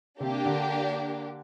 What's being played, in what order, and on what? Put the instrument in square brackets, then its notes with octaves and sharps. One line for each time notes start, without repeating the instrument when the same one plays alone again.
[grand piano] C3 [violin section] A#3 D4 G4
[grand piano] D3